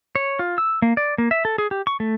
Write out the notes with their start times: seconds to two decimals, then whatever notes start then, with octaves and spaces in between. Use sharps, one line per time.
0.16 C#5
0.39 F4
0.58 E6
0.82 A#3
0.97 D5
1.18 A#3
1.31 E5
1.45 A4
1.58 G#4
1.71 G4
1.87 C#6
2.00 A3